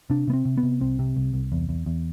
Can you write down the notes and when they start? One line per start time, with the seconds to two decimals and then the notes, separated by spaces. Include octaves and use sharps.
0.10 C3 D4
0.27 C3 B3
0.33 C4
0.45 C3
0.58 B3
0.63 C3
0.81 C2 C4
0.99 C3
1.16 C2
1.34 C2
1.52 E2
1.69 E2
1.86 E2